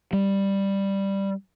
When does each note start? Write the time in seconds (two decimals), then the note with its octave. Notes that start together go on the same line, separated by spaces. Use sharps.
0.13 G3